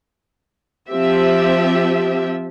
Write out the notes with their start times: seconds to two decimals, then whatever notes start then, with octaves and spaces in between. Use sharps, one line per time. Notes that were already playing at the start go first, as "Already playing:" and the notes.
0.88 F3 C4 G4 E5